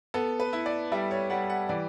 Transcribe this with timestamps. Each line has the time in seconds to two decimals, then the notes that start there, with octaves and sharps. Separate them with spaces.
0.14 B3 A4
0.40 B4
0.53 E4
0.66 D5
0.92 G3 E5
1.11 C#5
1.30 G3 F#5
1.50 F#5
1.69 E3 D5